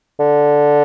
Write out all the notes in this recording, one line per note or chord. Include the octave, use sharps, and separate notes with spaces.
D3